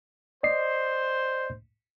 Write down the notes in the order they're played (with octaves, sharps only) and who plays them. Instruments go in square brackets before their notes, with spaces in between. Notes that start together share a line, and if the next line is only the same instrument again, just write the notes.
[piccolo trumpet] C5 [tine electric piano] D5 D#5 C7